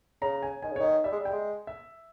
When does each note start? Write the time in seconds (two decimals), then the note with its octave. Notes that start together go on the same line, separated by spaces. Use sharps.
0.21 C#3 A#5
0.43 G#5
0.63 D#3 G#5
0.72 C#3
0.76 C#5
0.80 D#3 D#5
1.04 G3 E5
1.12 G#3
1.20 G3
1.25 G5
1.33 G#3
1.67 E5